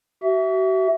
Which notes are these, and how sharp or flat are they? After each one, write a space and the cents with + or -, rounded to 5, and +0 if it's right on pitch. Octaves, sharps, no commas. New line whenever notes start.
F#4 +40 E5 +0